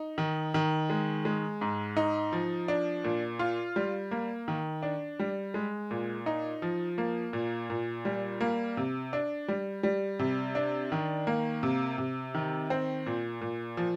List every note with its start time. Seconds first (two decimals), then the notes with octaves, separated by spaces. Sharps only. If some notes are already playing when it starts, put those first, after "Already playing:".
Already playing: D#4
0.18 D#3
0.54 D#3
0.90 G#3
1.25 G#3
1.61 G#2
1.97 D#4
2.33 F3
2.68 D4
3.04 A#2
3.39 F4
3.76 G3
4.11 A#3
4.48 D#3
4.82 D4
5.19 G3
5.54 G#3
5.91 A#2
6.26 D#4
6.62 F3
6.98 A#3
7.33 A#2
7.70 A#2
8.05 G3
8.41 A#3
8.77 C3
9.13 D4
9.48 G3
9.83 G3
10.19 C3
10.55 D4
10.92 D#3
11.27 A#3
11.63 C3
11.98 C3
12.34 D#3
12.70 C4
13.06 A#2
13.41 A#2
13.77 F3